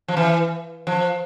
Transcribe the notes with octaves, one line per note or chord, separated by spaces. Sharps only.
F3
E3
F3